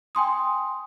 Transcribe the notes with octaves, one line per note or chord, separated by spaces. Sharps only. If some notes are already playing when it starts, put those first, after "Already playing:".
G5 G#5 C6 D#6